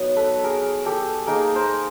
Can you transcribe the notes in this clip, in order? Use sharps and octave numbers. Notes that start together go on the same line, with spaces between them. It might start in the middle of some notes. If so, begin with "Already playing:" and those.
Already playing: F#3 B3 D#4
A4 B4
G#4 A#4
G4 A4
A#3 D#4 G#4 A#4
A#4 C5